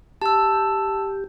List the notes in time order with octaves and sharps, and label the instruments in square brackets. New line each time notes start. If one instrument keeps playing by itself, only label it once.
[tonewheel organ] G4 [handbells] A5 E6